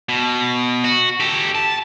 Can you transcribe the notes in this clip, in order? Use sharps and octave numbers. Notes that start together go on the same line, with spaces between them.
B2
F#4
G4 A4
A5